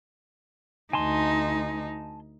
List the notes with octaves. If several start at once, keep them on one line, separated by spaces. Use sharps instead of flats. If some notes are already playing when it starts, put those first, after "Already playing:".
D2 D#4 G#5 A5 C6